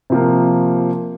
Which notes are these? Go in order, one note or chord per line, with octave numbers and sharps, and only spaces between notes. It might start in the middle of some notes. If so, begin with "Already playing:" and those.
C3 F3 A#3